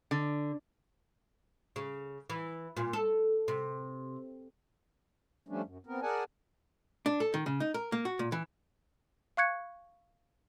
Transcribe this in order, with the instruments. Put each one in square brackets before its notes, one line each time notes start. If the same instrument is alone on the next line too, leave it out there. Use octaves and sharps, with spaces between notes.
[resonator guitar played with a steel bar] D3
[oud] C#3
E3
A#2
A4
C3
[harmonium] F3 G3 A3 C#4 D4
F#2
B3 C4 A#4
G#4 A#4 D5 F#5 G#5 A5
[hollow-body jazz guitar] D4
A4
D#3
C#3
D#4
A#4
A#3
F#4
A#2
E3
[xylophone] F5 C#6 F#6 G#6 C#7